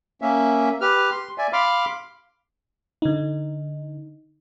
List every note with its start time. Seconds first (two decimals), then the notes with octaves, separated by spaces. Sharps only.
0.22 A#3 C#4 E5
0.81 G4 B4 F6
1.11 C6
1.38 D5 E5 G#5
1.53 F5 B5 C6 D6 F6
3.02 D3 D#4